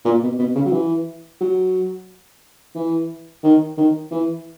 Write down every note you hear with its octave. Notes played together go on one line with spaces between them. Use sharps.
A#2
B2
B2
C#3
F#3
E3
F#3
E3
D#3
D#3
E3